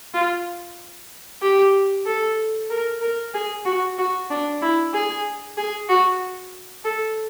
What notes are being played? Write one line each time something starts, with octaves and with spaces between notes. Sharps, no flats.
F4
G4
A4
A#4
A#4
G#4
F#4
F#4
D4
E4
G#4
G#4
F#4
A4